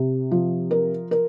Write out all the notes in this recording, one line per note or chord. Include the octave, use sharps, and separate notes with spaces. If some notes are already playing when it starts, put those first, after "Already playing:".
Already playing: C3
F3
A#4
A#4